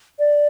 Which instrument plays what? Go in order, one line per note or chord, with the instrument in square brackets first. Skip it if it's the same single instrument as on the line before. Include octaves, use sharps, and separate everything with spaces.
[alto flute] D5